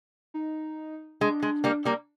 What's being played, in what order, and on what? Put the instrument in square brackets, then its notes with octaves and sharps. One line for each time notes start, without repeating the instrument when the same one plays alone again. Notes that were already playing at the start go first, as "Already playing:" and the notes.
[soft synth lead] D#4
[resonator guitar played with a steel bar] G#3 [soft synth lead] D4
[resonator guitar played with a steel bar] G#3
G3 A#3
G3 A#3